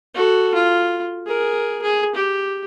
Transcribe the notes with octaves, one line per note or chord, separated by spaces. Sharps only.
F#4 A4
F4
G#4 A#4
G#4
G4